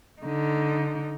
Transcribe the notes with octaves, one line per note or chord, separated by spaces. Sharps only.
D3 D#4